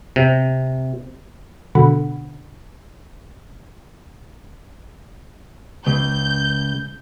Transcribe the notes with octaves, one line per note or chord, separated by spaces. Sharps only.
C3
B2 D3 F#5 B5
C#2 G6